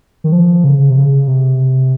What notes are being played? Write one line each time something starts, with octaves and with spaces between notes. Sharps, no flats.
D#3
F3
C#3
C#3
C3
C#3
C3